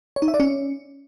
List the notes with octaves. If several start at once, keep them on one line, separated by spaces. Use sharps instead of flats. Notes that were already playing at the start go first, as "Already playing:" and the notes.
C#5
D#4
E5
D5
C#4